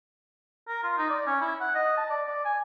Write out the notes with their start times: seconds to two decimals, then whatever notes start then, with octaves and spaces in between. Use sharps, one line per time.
0.68 A#4
0.84 F4
0.98 D#4
1.10 D5
1.26 C#4
1.41 E4
1.61 F#5
1.75 D#5
1.97 A5
2.10 D5
2.27 D5
2.45 G#5